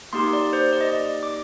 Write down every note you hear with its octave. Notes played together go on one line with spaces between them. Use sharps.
A#3 D#4 G4 C6
D5
C5
D5
D#5
D5
D6